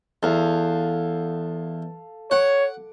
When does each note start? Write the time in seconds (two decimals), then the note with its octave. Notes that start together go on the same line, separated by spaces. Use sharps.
0.23 E2 A4 F5
2.31 C#5 F#5 D6